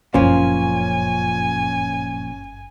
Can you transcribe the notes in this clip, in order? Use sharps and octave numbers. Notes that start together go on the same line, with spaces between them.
G1 F#2 A#2 F3 C#4 G#5